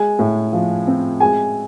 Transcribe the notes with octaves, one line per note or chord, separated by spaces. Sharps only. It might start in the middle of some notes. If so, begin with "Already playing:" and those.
Already playing: G#3 G#5
A2
F3
C4
G#3 G#5